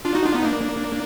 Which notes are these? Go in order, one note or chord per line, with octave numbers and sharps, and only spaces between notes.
D4 F4
D#4 F#4
D4 F4
B3 D#4
A#3 D4